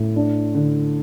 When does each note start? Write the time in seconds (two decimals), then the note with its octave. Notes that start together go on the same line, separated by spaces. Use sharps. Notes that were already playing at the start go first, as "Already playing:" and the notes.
Already playing: A2
0.16 D4
0.54 D3